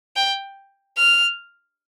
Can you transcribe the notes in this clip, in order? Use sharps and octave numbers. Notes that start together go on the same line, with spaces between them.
G5
F6